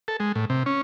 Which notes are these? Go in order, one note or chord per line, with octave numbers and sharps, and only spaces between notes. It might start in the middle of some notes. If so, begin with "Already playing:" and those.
A4
G#3
A2
C3
C#4